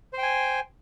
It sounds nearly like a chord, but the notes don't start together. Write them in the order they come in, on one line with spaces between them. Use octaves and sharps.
C5 G5 G#5